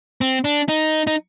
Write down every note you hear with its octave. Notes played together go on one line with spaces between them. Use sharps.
C4
D4
D#4
D#4